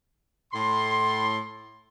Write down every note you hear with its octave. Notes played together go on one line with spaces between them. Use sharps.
A2 C6